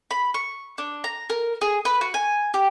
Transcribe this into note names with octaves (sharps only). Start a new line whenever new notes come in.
B5
C#6
D4
A#5
A#4
G#4
B4
F#4
G#5
G4